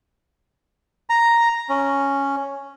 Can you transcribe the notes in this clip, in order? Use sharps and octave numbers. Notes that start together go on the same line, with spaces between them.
A#5
C#4